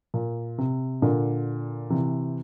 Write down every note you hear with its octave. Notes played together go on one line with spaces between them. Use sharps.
A#2
C3
A#2 D3
C3 E3